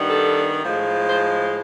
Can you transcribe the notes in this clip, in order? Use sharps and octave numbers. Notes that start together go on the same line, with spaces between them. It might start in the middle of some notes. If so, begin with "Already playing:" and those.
Already playing: G2 D#3 G3 B3
A4
A2 F3 G#3
C5